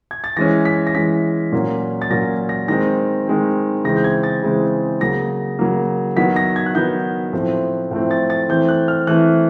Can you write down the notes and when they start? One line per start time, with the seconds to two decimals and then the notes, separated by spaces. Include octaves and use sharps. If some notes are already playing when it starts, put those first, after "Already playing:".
0.11 G#6
0.24 A6
0.37 E3 G#3 C#4 A#6
0.65 B6
0.87 A#6
0.94 E3 G#3 C#4 B6
1.52 A#2 F#3 A#3 C#4
2.02 A6
2.10 A#2 F#3 A#3 C#4 A#6
2.49 A#6
2.68 D#3 G#3 C4 A#6
3.27 D#3 G#3 C4
3.84 C#3 E3 G#3 C4 A#6
3.96 G6
4.04 G#6
4.23 A6
4.43 C#3 E3 G#3 C4
5.01 C#3 F#3 A#3 A#6
5.59 C#3 F#3 A#3
6.17 D#3 F#3 B3 B6
6.36 A#6
6.56 G#6
6.66 F#6
6.75 D#3 F#3 B3 G6
7.33 A2 F3 A3 C4
7.91 A2 F3 A3 C4
8.11 A6
8.30 A6
8.49 E3 A3 C4 G6
8.69 F#6
8.88 F6
9.07 E3 A3 C4 F#6